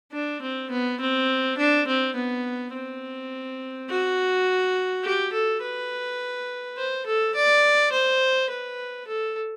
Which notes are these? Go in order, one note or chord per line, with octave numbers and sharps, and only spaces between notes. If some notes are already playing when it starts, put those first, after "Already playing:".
D4
C4
B3
C4
D4
C4
B3
C4
F#4
G4
A4
B4
C5
A4
D5
C5
B4
A4